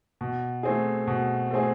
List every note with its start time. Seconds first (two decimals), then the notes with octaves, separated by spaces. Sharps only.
0.21 B2
0.63 A3 C4 G#4
1.07 B2
1.51 A3 C4 G#4